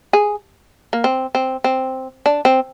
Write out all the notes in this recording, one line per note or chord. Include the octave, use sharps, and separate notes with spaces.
G#4
A#3
C4
C4
C4
D4
C4